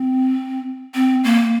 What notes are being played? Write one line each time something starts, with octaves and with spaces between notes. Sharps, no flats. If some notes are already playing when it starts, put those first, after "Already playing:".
Already playing: C4
C4
A#3